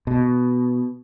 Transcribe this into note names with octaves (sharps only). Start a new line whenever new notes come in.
B2